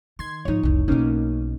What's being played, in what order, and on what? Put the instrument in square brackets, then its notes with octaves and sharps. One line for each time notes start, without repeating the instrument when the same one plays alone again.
[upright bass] D#3 [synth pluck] C6 G#6
[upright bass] G#2 F3 [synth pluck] D#4 C#5
[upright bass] F1 C2
[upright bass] B1 B2 [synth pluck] A#3 C#4 D#4